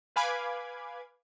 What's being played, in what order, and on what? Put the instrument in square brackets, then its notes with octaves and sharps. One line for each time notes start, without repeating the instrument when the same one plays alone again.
[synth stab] B4 F5 G#5 B5 D6 G#6